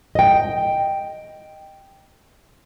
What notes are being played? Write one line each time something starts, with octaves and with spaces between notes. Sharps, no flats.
D#5 G5